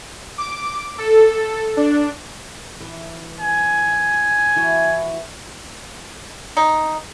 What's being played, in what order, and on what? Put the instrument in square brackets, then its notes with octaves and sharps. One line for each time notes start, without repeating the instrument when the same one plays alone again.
[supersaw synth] D6
A4
D4
[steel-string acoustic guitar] E3
[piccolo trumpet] G#5
[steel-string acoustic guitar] E3 E4 F#4
[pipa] D#4